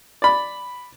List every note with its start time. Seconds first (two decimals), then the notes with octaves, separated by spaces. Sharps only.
0.22 D5 B5